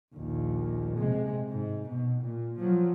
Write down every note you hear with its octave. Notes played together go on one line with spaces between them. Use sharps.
A#1 D#2
C3 G#3
G#2
B2
A#2
F3 F#3